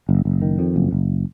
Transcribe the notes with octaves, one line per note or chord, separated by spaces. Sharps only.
F#1
F#1
D#3
F2
F#1
F#1